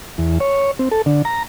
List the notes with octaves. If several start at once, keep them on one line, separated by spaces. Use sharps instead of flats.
E2
C#5
C4
A4
D3
A#5